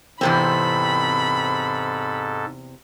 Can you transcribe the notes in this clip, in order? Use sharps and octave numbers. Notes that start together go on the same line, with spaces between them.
E2 G#2 C3 C4 A4 B5